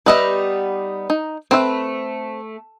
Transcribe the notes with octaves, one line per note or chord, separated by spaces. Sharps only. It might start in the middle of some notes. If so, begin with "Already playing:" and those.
G3 B3 D#4 B4 D#5 E5
D#4
A3 C4 B4 E5